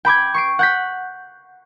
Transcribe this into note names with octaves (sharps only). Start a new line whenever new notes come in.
G5 B5 D6 G#6
C#6 C7 D7
F#5 G6 B6